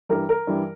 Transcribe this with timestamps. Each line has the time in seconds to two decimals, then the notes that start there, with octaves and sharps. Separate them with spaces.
0.09 G2 E3 G3 A#4
0.29 A#4
0.47 G2 E3 G3